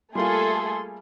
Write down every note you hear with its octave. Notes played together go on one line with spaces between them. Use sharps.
G3 A3 A#3 F4 G#4 A4 C6